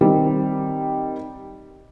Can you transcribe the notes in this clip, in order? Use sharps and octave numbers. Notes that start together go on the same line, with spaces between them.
D#3 G3 C4